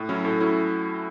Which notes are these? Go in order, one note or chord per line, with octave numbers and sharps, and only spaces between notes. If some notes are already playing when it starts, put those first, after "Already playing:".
Already playing: A2
F#3 C#4 E4
A2 A4
F#3 C#4 E4